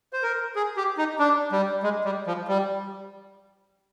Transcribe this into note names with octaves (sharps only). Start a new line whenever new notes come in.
C5
A#4
G#4
G4
D#4
D4
G3
G#3
G3
F3
G3